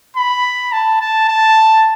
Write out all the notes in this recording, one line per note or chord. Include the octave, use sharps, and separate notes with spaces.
B5
A5
A5
A5